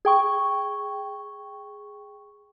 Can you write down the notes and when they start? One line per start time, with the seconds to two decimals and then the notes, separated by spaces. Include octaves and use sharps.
0.05 G#4 G5 C#6